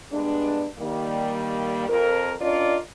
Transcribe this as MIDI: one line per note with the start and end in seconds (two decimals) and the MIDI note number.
0.12 0.67 43
0.12 0.67 56
0.12 0.67 59
0.12 0.67 62
0.79 1.86 51
0.79 1.86 55
0.79 1.86 58
1.88 2.33 41
1.88 2.33 70
2.40 2.76 61
2.40 2.76 62
2.40 2.76 65
2.40 2.76 70
2.40 2.76 74
2.40 2.76 75